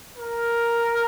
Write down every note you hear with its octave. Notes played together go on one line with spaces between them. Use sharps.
A#4